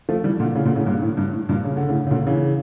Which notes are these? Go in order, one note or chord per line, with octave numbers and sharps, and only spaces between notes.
F3 A3
E3 G3
A#2 D3
A2 C#3
A#2 D3
A2 C#3
G2 A#2
A2
G2
A2
G2 A#2
C#3
D3
A2 C#3
C#3
A#2 D3
C#3 E3